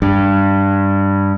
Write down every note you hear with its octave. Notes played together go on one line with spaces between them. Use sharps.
G2